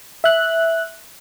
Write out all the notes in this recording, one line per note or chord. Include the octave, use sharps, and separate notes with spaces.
E5 F#6